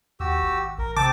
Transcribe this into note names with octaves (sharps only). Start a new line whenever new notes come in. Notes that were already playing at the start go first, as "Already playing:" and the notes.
D#2 F#4 G4 E6
G#1
A1 A#4
C3 C4 G5 A5 D6